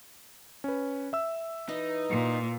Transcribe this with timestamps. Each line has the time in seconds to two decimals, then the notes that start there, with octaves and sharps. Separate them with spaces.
0.64 C#4 B4
1.13 E5 E6
1.69 E3 D#4
2.10 A#2